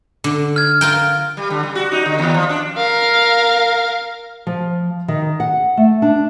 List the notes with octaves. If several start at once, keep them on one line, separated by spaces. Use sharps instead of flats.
D3
F6 G#6
F4 A#4 G5
G3
D3
G3
F#4
D#4
D3
D#2
F3
D4
A#4 F5
F3
D#3
F#5
A3
D4